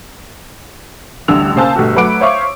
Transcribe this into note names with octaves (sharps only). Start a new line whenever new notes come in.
A1 D2 D3 G3 E6 F7
C#3 A#3 C5 G#5 A5 E6
G1 B2 A3 F#4 G4
F#3 A3 B4 F#5 D6 D7
C5 C#5 E5 F5 C#6 D6